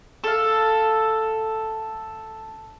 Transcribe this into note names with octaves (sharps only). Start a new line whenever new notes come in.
A4 F5